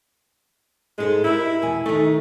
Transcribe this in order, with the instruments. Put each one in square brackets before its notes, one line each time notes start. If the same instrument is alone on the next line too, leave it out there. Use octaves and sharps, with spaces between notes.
[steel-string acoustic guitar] G#2 A4 C5 [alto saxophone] G#3
[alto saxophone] E4 [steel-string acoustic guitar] G4 A#4
[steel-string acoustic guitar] E2 B2 G#5
[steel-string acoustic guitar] D#3 D#4 [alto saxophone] A3